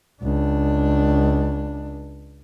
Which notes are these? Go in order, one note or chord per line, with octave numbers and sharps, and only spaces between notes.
C#2 D4